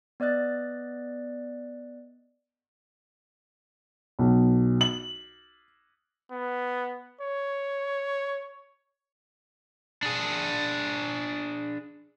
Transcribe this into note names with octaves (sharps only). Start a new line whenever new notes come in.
B3 D5 D#5 F#6 A6
B1
F#7
B3
C#5
D4 G#4